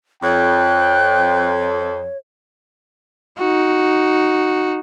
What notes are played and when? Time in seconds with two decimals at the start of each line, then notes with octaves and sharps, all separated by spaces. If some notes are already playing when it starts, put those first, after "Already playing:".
0.23 F2 C#5 G5 F#6
3.38 D#4 F#4